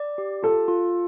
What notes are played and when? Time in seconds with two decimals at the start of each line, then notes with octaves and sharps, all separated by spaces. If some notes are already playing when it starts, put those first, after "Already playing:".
Already playing: D5
0.18 G4
0.43 F4 A4
0.68 F4